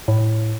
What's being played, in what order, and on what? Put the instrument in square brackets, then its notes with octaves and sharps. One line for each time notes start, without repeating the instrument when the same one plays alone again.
[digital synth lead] A2